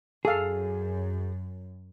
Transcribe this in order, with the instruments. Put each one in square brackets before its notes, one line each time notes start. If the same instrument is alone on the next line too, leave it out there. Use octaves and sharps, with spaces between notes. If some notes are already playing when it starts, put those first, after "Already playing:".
[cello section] F#2 [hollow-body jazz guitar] G#4 [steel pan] A4 F5